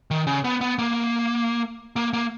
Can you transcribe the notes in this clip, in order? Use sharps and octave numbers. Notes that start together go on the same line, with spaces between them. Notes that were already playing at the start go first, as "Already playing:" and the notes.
D#3
C#3
B3
B3
A#3
A#3
A#3